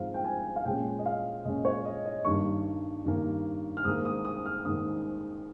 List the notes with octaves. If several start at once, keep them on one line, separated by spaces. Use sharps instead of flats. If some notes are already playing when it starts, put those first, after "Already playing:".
Already playing: G#2 F3 C4 F5
G5
G#5
F5
A#2 G#3 C#4 G5
D#5
F5
A#2 G#3 C#4 D#5
C#5
D#5
D#5
G2 D#3 G3 A#3 C#6
G2 D#3 G3 A#3
F6
G#2 D#3 A#3 D#6
D#6
D#6
F6
G#2 D#3 A#3 D#6